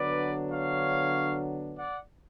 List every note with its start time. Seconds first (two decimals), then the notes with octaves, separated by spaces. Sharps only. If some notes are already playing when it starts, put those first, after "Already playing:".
Already playing: D3 F#3 B3 D4 B4 D5
0.52 C#5 F5
1.77 D5 F#5